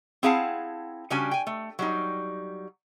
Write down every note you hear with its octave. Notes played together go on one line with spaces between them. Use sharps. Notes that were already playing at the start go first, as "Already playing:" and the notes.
C4 E4 G#4 F5 F#5 A5
C#3 G3 C#4 D4 F#4 G#5
G5 G#5
A3
F#3 G3 D#4